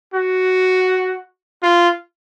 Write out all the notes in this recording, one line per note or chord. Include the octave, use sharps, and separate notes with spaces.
F#4
F4